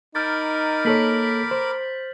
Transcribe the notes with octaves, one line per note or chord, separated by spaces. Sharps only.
D#4 A#4 B5 D6 F6 G6 A6
A#3 A4 C#5 F6 B6 F#7
C5